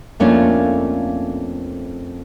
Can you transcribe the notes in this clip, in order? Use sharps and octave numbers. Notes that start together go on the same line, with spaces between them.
F2 A3 A#3 C#4 D4 F4